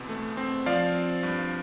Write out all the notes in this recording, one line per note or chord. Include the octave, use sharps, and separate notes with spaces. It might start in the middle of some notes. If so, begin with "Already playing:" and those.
Already playing: E2 B2 C4
A3
C4
F3 D5 F5
C4
G2